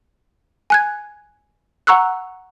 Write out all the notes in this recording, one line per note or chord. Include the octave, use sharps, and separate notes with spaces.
G#5 F#6 G#6
F#5 A#5 C#6 E6 F#6